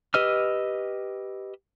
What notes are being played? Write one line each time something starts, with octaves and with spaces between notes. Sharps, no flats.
G4 B4 D#5 E6 F6